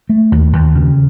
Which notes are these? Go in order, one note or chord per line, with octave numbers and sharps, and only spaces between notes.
A3
D#2
D#2
C#3